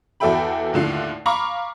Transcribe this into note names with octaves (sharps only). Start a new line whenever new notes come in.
E2 F#4 A4 E5 G5 B5
D#2 A2 D3 F4 C7
F5 A#5 B5 C#6 D6